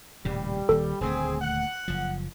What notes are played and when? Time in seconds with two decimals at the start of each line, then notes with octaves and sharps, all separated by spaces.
0.25 D#1 A2 C#3 G3
0.69 D#1 D#2 A4
1.01 D#1 D2 A3 C4 G#4
1.41 F#5
1.88 F#1 F3